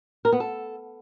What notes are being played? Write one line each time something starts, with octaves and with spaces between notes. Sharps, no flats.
A#4
B3
A4